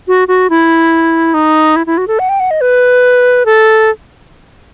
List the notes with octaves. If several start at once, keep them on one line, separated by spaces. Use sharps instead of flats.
F#4
F#4
E4
D#4
E4
E4
F#4
A4
F#5
G5
F#5
D#5
B4
A4